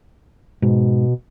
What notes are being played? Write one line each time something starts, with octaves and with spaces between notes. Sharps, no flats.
G#2 B2